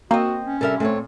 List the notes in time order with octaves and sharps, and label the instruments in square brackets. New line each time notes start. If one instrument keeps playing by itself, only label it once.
[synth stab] A#3 [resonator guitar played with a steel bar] C4 D#5 [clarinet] F#4
[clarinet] C#4
[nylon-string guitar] C3 G3 [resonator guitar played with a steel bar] A4 A#4 E5
[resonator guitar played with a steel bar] A#2 [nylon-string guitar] A3 C4 C#5